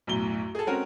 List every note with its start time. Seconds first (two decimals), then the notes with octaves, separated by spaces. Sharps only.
0.07 B1 F#2 A2 G7
0.55 G#4 A4
0.67 G#3 C4 C#4 F#4 A#4